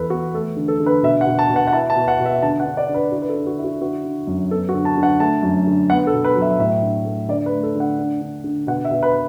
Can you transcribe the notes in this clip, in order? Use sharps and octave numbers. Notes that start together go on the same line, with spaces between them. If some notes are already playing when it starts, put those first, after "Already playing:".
Already playing: E2 B3 E4 A4 B4
B3 F#4
A3 A4
D3
A4
D3
B4
B2 E5
F#5
B2
A5
B2
F#5
F#5
E4 A5
A5
B2
F#5
B2
E5
D3 A5
F#5
D4
D5
D3
B4
E4 F#4
B4
A4
D3
F#4
E4
F#4
D3 F#4
D3
F#2
B3 A4
F#4
D3
A5
D3
F#5
A3 A5
F#2
D3
B3 F#5
A4
B2
B4
F#3
E5
A2 E5
D4
A3
D3 D5
B4
A3
A4
D3 F#5
D4
D3
D3
B2 F#5
E5
B2
B4